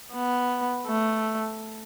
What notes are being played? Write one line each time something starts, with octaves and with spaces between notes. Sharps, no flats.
B3
A3